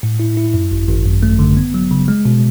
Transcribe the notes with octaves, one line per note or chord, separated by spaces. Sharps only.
A2
E4
E4
F#2
G#1
G#1
F#2
A3
D3
B3
F#3
C#3
G#3
B2